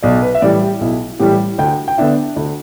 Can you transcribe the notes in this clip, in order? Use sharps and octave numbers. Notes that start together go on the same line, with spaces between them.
B1 D5
B4
E5
A2 E3 G3 D5
G4
B1 E4
A2 E3 G3 G4
D2 G5
G5
D3 B3 D4 E5
D2